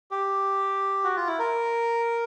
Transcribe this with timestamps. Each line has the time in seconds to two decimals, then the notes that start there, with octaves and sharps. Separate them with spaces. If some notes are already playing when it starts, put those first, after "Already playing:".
0.11 G4
1.04 F#4
1.16 F4
1.27 E4
1.39 A#4